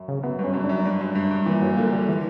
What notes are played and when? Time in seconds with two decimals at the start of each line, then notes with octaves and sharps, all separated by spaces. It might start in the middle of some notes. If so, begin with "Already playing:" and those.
Already playing: F#2
0.08 C#3
0.23 F#2 B3
0.39 G2 C#4
0.54 F#2
0.64 D4
0.69 F#2
0.85 G2 D4
1.01 F#2
1.15 G2
1.31 G2
1.46 A#2 E3
1.62 F#3
1.77 D3 A#3
1.92 G3
2.07 D3 E3